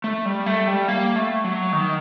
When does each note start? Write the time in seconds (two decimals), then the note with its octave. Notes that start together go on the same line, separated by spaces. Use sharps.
0.04 A3
0.25 G3
0.46 A3
0.67 G3
0.88 A#3
1.16 A3
1.44 F#3
1.72 D#3